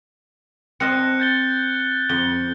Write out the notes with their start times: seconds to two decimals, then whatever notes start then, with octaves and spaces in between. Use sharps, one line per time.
0.80 C4 D#5 A5 F6 F#6 C#7
1.20 G6 A6 G7
2.09 F2 G7